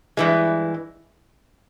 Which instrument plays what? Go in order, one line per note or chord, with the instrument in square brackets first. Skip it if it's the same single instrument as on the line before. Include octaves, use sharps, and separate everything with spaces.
[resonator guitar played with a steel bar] G2 E3 G#3